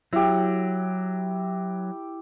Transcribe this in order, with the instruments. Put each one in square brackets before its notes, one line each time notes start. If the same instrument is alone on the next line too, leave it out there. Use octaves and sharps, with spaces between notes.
[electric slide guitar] F#3 [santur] E4 G4